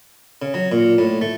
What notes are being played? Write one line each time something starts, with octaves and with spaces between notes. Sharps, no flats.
C#3
F#3
A#2
A2
A3